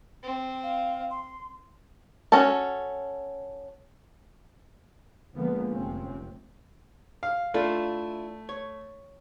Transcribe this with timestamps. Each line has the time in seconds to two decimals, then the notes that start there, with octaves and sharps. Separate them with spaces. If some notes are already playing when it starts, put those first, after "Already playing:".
0.23 C4
0.63 F5
1.10 C6
2.32 C#4 F#4 A4 A5
5.33 D3 F3 G#3 A#3 B3
5.71 F1 C3 C4 C#4
7.23 F5
7.54 A3 D4 E4 F4
8.49 C#5